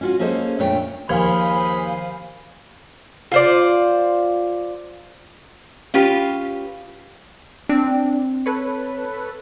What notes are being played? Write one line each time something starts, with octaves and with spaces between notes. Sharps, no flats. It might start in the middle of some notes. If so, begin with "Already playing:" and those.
C#4 F4 F#4
A#3 C#4 G#4 A4 C5 D#5
F2 A#2 A3 D4 C#5 G5
D#2 F3 G#3 C5 F5 G#5 B5
F4 C5 D5
C#4 F4 G4 B4
C4 D4
A4 B4 C#5